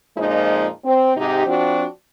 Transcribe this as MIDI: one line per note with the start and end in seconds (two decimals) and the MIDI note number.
0.17 0.67 41
0.17 0.67 46
0.17 0.67 53
0.17 0.67 56
0.17 0.67 63
0.85 1.12 60
1.16 1.46 44
1.16 1.46 48
1.16 1.46 63
1.16 1.46 67
1.46 1.85 53
1.46 1.85 60
1.46 1.85 62
1.46 1.85 66